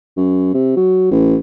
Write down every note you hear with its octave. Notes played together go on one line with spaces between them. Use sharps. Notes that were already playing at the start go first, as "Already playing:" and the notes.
F#2
C3
F#3
A1